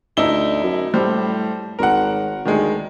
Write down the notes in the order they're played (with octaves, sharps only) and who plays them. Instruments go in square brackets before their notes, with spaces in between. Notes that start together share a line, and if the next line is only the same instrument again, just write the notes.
[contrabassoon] D2 [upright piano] D#4 E4 G7
[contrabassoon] F#2
[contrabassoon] A2 [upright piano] G3 C5
[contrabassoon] G#1 [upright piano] A#4 F#5
[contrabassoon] D2 [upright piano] D#3 G#3